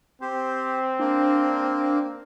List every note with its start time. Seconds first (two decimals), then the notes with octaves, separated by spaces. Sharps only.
0.21 C4 G4 C5
0.99 A#3 D4